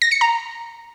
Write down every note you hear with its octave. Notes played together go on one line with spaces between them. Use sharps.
A#6
C#7
A#5